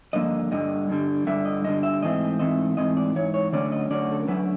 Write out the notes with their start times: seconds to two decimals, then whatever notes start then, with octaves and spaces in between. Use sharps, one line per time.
0.13 G2 D3 F3 A#3 D#5
0.51 G2 D3 G3 D#5
0.89 G2 D3 G3
1.27 G2 D3 G3 E5
1.45 D#5
1.64 G2 D3 G3 D#5
1.83 E5
2.02 G#2 E3 A3 C4 D#5
2.39 G#2 E3 A3 C4 D#5
2.77 G#2 E3 A3 C4 D#5
2.97 D5
3.15 G#2 E3 C#5
3.34 C#5
3.52 D3 F#3 A3 C#4 D5
3.72 D#5
3.90 D3 F#3 A3 C#4 D5
4.12 A4
4.20 A#4
4.28 D3 F#3 A3 C#4 B4